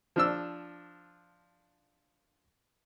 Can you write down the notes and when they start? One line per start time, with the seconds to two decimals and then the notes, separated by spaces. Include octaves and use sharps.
0.16 F3 D4 E6